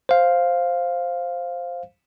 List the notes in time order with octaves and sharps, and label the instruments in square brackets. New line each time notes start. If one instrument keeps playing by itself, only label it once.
[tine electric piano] C5 F5